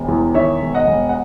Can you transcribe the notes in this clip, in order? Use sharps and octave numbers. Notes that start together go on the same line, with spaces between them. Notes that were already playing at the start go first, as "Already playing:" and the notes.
Already playing: E1
E2
D#3 C#5 E5
E1
D#5 F#5
E1
F#5